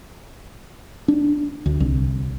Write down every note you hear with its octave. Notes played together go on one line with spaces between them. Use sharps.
D4
D2
C2